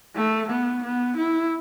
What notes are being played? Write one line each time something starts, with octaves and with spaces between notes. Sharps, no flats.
A3
B3
B3
E4